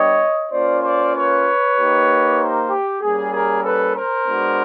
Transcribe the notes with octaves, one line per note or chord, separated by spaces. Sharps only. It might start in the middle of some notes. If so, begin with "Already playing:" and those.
Already playing: G3 B3 D4 G4 C#5 D#5
A#3 C#4 F4 C5 D5
C5 D5
B4 C#5
A#3 D#4 G4
A#4 C5
G4
G3 A#3 C#4 G#4
G#4 A#4
A4 B4
A#4 C5
G#3 B3 D4 F#4